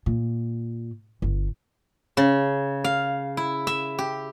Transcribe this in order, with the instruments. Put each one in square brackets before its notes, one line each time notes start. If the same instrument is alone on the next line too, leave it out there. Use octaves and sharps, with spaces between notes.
[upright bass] A#2
G1
[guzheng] C#3
F5
E4
E5
G4